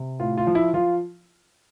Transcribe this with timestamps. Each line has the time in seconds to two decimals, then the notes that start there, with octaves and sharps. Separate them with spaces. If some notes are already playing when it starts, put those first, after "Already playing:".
Already playing: C3
0.20 A2 F4
0.37 F4
0.47 F3
0.55 E4
0.74 F3 F4